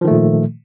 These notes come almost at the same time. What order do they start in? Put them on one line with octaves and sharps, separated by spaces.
F3 D#3 A3 A#2